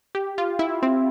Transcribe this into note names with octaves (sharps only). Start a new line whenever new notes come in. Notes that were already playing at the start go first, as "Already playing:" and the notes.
G4
F4
E4
C4